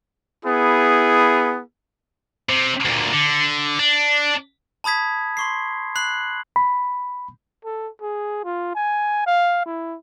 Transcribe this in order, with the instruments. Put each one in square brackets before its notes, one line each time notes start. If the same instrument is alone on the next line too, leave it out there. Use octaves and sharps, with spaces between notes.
[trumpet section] B3 E4 G#4
[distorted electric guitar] C3
D2 A#2
D3
D4
[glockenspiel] A5 B5 D#6 G#6 B6
C6 C#6 C7
B5 F#6 C7 F#7
[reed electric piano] B5
[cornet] A4
G#4
F4
G#5
F5
E4